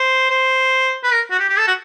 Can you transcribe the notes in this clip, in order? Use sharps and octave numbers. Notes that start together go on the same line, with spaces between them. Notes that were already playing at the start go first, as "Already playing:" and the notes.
Already playing: C5
C5
B4
A#4
F#4
G4
G4
A4
F#4